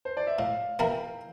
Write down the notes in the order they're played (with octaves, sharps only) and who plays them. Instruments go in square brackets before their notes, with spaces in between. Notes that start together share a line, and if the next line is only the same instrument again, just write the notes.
[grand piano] C5
D5
E5
[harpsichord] A2 [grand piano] F5
[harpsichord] E3 A#3 E4 A#4 [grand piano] G5